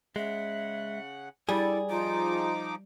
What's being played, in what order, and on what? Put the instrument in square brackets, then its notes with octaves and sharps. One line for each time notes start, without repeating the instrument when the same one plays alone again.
[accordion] C#3 F#5 [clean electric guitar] G#3 [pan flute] E5
[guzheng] G3 [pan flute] E4 [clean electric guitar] G#4 [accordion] A4 D5
[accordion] F3 D#4 D6 [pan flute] F4